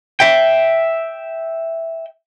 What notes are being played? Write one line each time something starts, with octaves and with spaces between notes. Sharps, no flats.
E5 G5